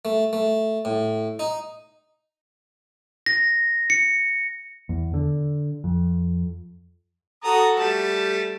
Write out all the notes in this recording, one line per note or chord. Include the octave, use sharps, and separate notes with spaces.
A3
A3
A2
D#4
A#6
C#7
E2
D3
F2
F#4 A4 A#5 D#6
G3 A3 A5